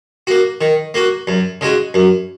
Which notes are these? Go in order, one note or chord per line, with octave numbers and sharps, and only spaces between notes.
A#3 F#4
D#3
A#3 F#4
F#2
C#3 G#3 F#4
F#2